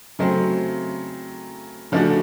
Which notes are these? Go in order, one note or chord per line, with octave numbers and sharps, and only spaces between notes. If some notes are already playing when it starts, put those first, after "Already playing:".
C#3 F#3 A3 C4
C#3 F3 A3 D4 F#4